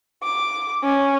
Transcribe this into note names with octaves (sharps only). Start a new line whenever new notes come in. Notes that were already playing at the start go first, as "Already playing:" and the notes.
D6
C#4